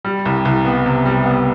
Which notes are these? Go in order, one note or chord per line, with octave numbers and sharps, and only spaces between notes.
G3
C2
C2
B3
C3
G3
B3